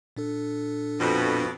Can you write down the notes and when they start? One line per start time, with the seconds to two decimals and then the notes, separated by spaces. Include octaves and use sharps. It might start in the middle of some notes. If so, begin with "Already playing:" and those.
0.17 A#2 D4 A4
1.00 F2 B2